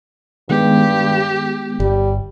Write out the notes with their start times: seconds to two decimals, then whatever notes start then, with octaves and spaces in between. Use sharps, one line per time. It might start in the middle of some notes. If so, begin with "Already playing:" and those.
0.50 G2 D#3 G#3 B3 G4
1.80 G1 G3